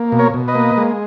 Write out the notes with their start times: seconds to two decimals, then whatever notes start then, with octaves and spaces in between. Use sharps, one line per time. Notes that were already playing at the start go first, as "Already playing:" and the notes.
Already playing: A#3
0.12 B2
0.19 A#4 C#5
0.34 B2
0.48 B4 D#5
0.55 A#3
0.77 G#3